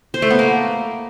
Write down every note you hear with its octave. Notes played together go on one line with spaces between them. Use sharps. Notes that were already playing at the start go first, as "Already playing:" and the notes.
C5
A3
B3
A#3